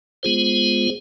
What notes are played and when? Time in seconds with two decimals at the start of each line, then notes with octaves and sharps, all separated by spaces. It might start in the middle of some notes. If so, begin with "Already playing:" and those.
0.23 G#3 B3 F4 G#4 C5